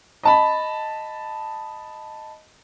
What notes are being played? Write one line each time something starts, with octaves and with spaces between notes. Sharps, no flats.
D#5 A5 B5